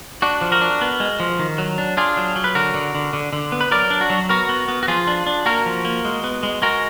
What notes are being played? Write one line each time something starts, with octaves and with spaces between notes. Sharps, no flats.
D4 F#4
F3
F#4 A#4
D4
B3
G#3
F3
D#3
F#3
D4
D4 F4 G#4
F#3
F#3
B4
D3 F#4 A#4
D3
D3
D3
D3
B3
B4
F#3 A#4 D5
D4
F#4
F#3
B3 F#4 A#4
B3
B3
F#4
F3 F4 G#4
D4
D4
A#3 F#4 A#4
F3
A#3
G#3
B3
G#3
G#3 F#4 A#4